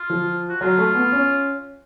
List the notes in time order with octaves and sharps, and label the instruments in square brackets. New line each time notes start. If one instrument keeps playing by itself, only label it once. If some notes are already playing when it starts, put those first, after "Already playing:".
Already playing: [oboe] F4
[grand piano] F3
[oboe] F#4
[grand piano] F#3 [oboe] F4
[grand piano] A3
B3
C#4